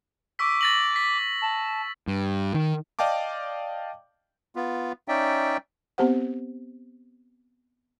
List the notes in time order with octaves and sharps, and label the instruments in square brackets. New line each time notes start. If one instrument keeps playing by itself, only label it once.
[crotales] C#6 E6 B6 [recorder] D6
[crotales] A6 A#6 F#7
B6
[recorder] A5
[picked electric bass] G2
D#3
[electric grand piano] D5 D#5 F5 G5 A5 D6
[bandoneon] B3 F4
C#4 D#4 D5 E5 G5
[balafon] B3 C4 G4 C5 F#5